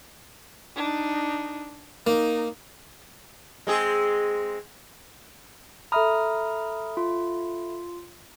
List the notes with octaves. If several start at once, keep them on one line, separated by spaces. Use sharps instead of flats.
D4 D#4
A#3 D#4
G#3 C4 G#4
A4 E5 A#5 B5 D#6 F6
F4